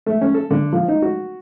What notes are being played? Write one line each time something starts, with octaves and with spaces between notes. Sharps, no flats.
A3
C#4
A4
D3
F3
D#4
F#4